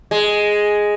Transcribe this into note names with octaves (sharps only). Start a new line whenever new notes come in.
G#3